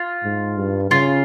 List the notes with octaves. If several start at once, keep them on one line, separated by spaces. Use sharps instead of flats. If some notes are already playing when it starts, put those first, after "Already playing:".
Already playing: F4
G#2
G2
C#3 F4